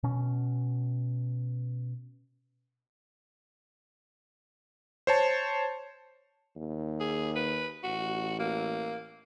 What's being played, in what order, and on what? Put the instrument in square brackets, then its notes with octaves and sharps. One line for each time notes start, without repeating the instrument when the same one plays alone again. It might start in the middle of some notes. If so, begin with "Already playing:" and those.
[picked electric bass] B2 C#4
[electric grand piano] C5 C#5 A5
[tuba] D#2
[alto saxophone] G#4
B4
[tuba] A1 [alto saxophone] F#4
[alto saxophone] A#3